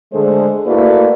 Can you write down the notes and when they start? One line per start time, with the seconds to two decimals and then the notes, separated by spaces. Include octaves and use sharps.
0.13 D3 G#3 A3 D4 G#4 C5
0.66 A3 A#3 E4 F#4 B4 D5